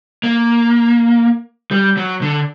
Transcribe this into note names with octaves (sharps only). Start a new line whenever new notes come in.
A#3
G3
F#3
D3